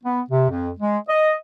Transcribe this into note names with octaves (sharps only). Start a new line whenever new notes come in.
B3
C3
F2
G#3
D#5